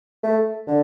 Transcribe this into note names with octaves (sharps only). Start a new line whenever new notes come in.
A3
D3